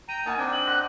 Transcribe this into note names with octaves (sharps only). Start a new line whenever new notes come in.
G5 A#5 D#7
A#3 D#4 F#5 G#5 A5 C#6
C4 D4 G5 A5 D6
F#7
D#5 F#5 C6 D6 F#6